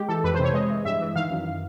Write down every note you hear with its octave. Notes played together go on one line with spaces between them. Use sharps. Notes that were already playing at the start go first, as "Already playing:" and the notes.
Already playing: G#3 G4
E3 A4
F2 B4
C3 C5
C#5
G#3 D#5
E3
G2 E5
E3
D#3 F5
F#2